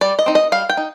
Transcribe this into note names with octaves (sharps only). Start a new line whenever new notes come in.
G3 D5
D#5
C4 D#4
D#5
G3 F5
G5
D#4